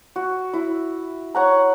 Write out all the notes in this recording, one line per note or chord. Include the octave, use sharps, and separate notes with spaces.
F#4
E4
C#5 F#5 A#5